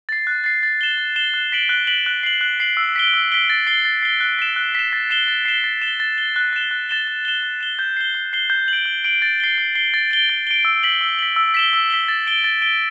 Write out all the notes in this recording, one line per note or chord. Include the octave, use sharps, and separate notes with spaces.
A6 C7
F#6
A6 C7
A6
E7 G7
A6
E7 G7
F#6
B6 D7 F#7
F#6
B6 D7 F#7
F#6
C7 F#7
F#6
C7 F#7
E6
B6 D7 G7
E6
B6 D7 G7
A6
C7 G7
A6
C7 G7
F#6
B6 E7
F#6
B6 E7
A6
C7 E7 G7
A6
C7 E7 G7
A6
E7 G7
A6
E7 G7
F#6
A6 E7 G7
F#6
A6 E7 G7
A6
E7 G7
A6
E7 G7
G6
C7 G7
G6
C7 G7
G6
D7 F#7
G6
D7 F#7
A6
C7 G7
A6
C7 G7
A6
D7 G7
A6
D7 G7
E6
B6 F#7
E6
B6 F#7
E6
B6 E7 G7
E6
B6 E7 G7
A6
D7 G7
A6
D7 G7